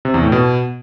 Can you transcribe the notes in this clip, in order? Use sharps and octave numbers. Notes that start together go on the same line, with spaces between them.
C3
E2
A2
B2